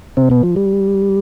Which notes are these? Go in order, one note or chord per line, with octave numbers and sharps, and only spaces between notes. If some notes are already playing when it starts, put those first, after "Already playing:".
C3 C4
B2 B3
F3
G3